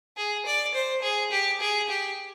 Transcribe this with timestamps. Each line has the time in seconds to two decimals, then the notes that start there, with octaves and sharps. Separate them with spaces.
0.17 G#4
0.46 D5
0.74 C5
1.02 G#4
1.31 G4
1.61 G#4
1.89 G4